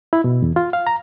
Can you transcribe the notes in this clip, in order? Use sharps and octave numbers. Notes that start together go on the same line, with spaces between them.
E4
B2
E2
F4
F5
A#5